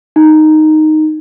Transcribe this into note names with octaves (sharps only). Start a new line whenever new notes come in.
D#4